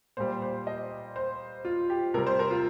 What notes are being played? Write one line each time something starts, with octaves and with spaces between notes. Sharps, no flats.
A#2 G3 C5
C5
D#5
C5
F4
G4
C3 G3 A#4
C5
A#4
F4